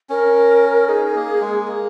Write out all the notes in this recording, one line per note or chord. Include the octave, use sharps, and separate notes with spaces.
C#4 A#4
D#4 G#4
A#3
G#3
A#3